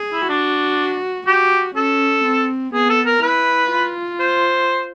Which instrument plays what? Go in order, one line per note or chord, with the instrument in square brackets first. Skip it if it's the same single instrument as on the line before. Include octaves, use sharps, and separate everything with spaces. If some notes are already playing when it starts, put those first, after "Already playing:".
Already playing: [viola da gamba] G#4
[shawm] E4
[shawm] D4 [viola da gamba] F#4
[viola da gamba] F#4 [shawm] G4
[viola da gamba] C#4 [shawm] A4
[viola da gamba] C4
[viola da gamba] B3 [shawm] G#4
[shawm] A4
A#4
[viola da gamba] E4 [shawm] B4
[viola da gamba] F4
[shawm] C5